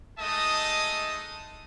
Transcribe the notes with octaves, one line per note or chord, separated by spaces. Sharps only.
G#3 A3 D#4 D#5 A5 D#6